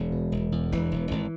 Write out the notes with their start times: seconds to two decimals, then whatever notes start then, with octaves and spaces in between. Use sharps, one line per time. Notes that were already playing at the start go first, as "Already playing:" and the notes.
Already playing: E1 G#3
0.12 B2
0.32 E1
0.52 E2
0.72 E1 E3
0.91 E1
1.11 G#1